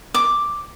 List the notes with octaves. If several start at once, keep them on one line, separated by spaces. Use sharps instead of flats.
D6